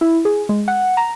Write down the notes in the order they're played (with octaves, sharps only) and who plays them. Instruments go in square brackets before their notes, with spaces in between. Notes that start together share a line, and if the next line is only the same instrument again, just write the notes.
[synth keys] E4
G#4
G#3
F#5
A#5